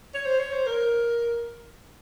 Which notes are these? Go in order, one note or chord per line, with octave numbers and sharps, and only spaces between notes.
C#5
C5
C#5
C5
A#4